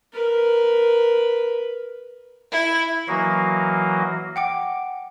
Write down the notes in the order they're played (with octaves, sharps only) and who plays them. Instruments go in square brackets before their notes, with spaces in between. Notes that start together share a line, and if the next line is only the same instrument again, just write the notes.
[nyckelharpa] A#4 B4
[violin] E4
[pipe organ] E3 F#3 A#3 F#4 D#5 F5
[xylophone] F#5 G5 D6